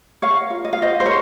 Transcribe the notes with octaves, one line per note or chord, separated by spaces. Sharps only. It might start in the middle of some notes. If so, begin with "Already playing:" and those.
A#4 C#5 F5
F4
D#5
F5
F4 C5 D#5
C5
A#4 C#5